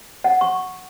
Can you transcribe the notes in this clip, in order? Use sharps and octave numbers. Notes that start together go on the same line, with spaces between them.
F#5
C#6